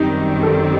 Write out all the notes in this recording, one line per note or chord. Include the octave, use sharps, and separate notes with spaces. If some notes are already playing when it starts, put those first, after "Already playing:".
Already playing: F#2 D#3 G3 C4 D#4
A4